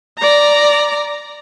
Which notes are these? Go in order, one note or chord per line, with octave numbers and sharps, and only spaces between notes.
D5 A#5